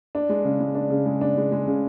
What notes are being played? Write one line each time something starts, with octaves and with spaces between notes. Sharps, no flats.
D4
G#3
C#3
G#3
D4
C#3
G#3
D4
G#3
G#3
C#3